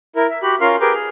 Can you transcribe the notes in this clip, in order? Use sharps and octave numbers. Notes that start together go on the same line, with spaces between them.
E4 A#4
E5
F#4 G4 B5
C#4 F4 A#4 F5 C6 F6
G4 G#4 A#4 B4 G5
G#4 F6